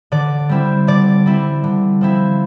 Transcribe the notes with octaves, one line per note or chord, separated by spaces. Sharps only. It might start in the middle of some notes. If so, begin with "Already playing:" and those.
D3 D5
G3 C4 E4
D3 D5
G3 C4 E4
D3
F3 C4 E4